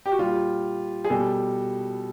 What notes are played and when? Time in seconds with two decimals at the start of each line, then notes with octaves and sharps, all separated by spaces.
0.06 G4
0.12 F#4
0.19 A#2 G3 F4
1.05 G#4
1.10 B2 G3 A4